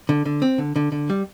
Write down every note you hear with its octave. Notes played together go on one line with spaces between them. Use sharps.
D3
D3
C4
D3
D3
D3
G3